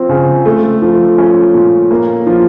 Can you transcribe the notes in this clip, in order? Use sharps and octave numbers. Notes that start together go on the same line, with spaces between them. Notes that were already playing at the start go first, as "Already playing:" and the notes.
Already playing: F3 C4
C#3
A3
F3
C#4
A#2
A#3
F3